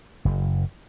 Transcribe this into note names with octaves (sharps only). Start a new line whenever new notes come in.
F#1